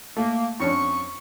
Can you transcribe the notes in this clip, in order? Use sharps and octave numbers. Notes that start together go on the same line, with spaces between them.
A3 A#3
F2 C#4 D4 C#6